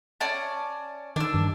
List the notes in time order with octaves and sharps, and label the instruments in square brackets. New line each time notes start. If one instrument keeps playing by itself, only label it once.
[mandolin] C#4 D5 A5
[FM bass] D#3 [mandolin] D4 E6
[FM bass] G2